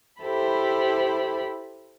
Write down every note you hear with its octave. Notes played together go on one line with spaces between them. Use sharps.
E4 G4 A4 C5 B5